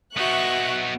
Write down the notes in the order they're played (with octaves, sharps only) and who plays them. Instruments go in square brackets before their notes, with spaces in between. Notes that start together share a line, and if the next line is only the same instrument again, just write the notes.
[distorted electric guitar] B3 D#4 [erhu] F#4 [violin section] E5 C#6 F#6